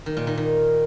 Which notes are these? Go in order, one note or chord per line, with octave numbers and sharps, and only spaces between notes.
D#3
A#2
D#3
D#3